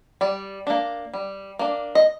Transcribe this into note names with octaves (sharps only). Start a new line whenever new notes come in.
G3 D5
A#3 D4
G3
A#3 D4
D#5